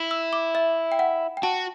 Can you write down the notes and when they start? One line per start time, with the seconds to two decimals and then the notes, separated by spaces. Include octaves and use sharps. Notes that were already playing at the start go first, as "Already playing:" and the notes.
Already playing: E4
0.11 E6
0.33 D6
0.55 E5
0.92 G5
0.99 F#5
1.37 G5
1.43 F#4 A5